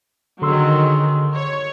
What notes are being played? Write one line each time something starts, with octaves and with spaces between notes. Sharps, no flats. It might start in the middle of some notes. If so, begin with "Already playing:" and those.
D3 D#3 F#3 G#4 C6 E6
C#5